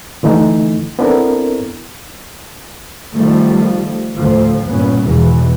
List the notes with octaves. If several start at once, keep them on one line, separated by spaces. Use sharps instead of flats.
D3 E3 A3 D#4
B3 C4 D4 E4 A4 A#4
D#3 F3 G3 A3
D2 A2 F3
G1 A#2 B3 C#4
G#1 E2 G#2 B2 E3